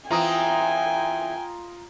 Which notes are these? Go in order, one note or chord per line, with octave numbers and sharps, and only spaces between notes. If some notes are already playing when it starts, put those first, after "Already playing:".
E3 C4 F4 G5 G#5 A#5 D#6